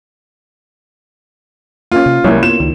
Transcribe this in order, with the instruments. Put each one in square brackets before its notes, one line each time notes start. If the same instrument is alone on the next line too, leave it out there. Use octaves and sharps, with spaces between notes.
[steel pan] A#3 C#4 [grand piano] F4
[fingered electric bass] C3
[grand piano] C2 [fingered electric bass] F#3 G#3 [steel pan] A#3 E4 C#5
[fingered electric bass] A#3 B3 [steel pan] F4 [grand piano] E7
[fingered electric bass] C#2 [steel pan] D#3